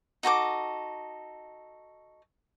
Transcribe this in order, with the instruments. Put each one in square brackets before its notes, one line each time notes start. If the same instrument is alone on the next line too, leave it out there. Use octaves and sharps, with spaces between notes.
[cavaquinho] D#4 F#4 A4 D6